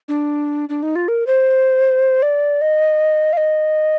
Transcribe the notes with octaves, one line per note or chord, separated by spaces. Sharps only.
D4
D4
D#4
F4
A#4
C5
D5
D#5
F5
D#5